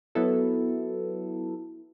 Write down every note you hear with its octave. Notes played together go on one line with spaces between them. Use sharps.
F#3 B3 E4 A4